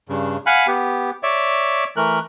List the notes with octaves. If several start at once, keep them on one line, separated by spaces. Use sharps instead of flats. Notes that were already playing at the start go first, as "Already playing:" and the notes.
G2 C#3
F5 F#5 G#5 B5 F#6
B3 G4
C#5 D5 E5
E3 A3 A#4 F#6